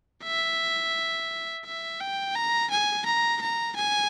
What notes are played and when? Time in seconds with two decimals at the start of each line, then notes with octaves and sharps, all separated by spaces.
0.24 E5
1.66 E5
2.01 G5
2.36 A#5
2.71 G#5
3.06 A#5
3.41 A#5
3.76 G#5